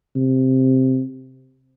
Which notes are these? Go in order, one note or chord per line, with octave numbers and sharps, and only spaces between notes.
C3